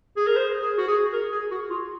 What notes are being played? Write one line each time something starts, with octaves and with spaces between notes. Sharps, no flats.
G#4
A#4
C5
G#4
F#4
G#4
A#4
G#4
F#4
F4